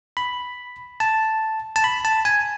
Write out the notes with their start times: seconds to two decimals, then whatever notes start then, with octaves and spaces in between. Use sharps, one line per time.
0.17 B5
1.00 A5
1.76 A5
1.84 B5
2.05 A5
2.25 G#5